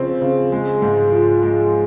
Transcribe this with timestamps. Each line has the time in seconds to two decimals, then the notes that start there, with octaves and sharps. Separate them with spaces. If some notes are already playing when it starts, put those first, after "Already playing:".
Already playing: C#3 F3 C4
0.22 C#3
0.52 G#3
0.82 G#2
1.12 F3
1.43 G#3